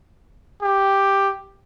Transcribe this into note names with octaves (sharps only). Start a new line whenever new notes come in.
G4